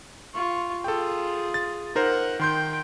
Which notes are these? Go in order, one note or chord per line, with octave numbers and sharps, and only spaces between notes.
F4 C#6
F4 G#4 A4 G5
A6
D#4 A#4 C5 F#5
D#3 G5 C6 G6